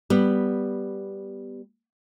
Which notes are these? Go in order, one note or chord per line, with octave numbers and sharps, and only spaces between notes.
G3 B3